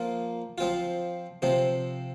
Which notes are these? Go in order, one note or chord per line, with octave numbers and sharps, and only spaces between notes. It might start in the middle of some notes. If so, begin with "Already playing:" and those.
Already playing: F3 A#3 F4
F3 C4 F4
C3 F3 C4